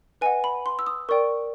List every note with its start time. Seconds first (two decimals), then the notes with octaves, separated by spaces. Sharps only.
0.21 B4 D#5 F#5 G#5
0.44 B5
0.66 C6
0.79 E6
0.87 D#6
1.09 A#4 D5 G5 C#6